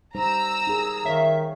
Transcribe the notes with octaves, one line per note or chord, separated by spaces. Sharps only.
G3 D#4 C5 A#5 E6
D#4 G#4 A#4
D#3 C#5 E5 F5